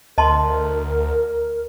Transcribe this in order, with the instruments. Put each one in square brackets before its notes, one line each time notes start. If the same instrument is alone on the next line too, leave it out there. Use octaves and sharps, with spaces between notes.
[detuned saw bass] D2 [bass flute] A#4 [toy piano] D#5 A5 C6